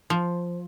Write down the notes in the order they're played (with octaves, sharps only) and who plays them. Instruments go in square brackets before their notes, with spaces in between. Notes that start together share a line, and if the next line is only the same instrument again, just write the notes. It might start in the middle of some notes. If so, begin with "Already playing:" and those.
[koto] F3